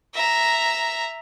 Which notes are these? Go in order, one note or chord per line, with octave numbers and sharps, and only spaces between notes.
E5 A#5